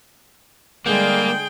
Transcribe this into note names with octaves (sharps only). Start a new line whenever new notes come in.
D3 G3 G#3 A#3 G#4 G5